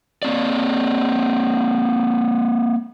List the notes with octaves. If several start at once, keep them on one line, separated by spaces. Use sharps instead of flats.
A#3 C4 D5